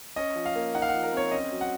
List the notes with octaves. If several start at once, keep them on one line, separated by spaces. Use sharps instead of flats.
C#4 D#5
F3
F5
A#3
D#4 F#5
F5
F#5
F3
A#4
C4 C#5
C#4 D#5
F#3
F#5